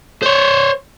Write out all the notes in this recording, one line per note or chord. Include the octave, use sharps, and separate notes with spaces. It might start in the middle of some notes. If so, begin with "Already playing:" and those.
C5 C#5